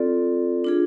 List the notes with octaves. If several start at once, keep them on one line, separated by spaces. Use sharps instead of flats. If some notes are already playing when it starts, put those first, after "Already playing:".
Already playing: C4 F4 A4 D5
D4 F4 G#4